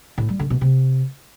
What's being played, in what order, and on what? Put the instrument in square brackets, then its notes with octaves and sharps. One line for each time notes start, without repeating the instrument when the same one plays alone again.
[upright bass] A2
G3
D3
B2
C3